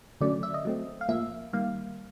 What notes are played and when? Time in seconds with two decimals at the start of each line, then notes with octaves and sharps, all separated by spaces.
0.21 D3 F#3 A3 C#4 D5
0.43 E5
0.54 D#5
0.65 F#3 A3 C4
1.01 F5
1.09 A2 F3 A#3 E5
1.53 D#3 G3 A#3 F5